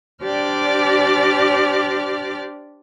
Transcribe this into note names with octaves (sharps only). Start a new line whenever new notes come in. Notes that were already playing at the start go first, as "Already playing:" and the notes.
D4 G4 C5 D5 D6 F6